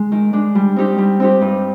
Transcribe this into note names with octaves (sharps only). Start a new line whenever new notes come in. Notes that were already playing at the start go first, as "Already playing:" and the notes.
Already playing: G#3
D#3
G#3 D4
G3
C4 D#4 G4
G3
C4 D#4 G4
G2